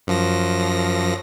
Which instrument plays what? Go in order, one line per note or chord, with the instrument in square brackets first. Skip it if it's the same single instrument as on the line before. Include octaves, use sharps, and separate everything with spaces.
[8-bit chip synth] F#2 F3 A#6